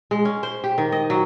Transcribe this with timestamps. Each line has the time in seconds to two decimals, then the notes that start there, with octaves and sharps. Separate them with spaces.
0.11 G#3
0.25 C#4
0.43 C5
0.64 G4
0.78 D#3
0.92 D#5
1.10 F#3